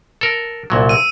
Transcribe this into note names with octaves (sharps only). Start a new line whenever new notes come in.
A4 A#4
C2 A#2 F#3
E6 D#7